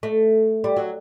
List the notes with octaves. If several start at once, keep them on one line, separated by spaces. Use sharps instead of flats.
A3
G3
F#3